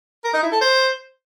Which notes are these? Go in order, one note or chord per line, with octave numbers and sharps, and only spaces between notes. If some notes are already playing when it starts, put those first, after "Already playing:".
A#4
D#4
E4
A4
C5